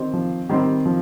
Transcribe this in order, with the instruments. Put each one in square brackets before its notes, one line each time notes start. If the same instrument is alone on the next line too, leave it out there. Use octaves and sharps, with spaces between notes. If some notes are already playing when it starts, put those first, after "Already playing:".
Already playing: [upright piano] D#3 C4 G4 C5
[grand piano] F3
[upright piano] D#3 C4 G4 C5 [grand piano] G3
[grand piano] F3